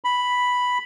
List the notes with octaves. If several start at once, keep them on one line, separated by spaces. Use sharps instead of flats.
B5